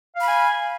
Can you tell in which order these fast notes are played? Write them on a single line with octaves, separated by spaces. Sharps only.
F5 B5 G#5